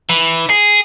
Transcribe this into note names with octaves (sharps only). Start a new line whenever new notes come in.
E3
G#4